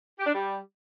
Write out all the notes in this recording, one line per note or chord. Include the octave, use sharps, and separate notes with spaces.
G4
D4
G3